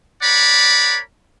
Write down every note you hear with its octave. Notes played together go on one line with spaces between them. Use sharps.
A#4 C#5 D5 F#5 B5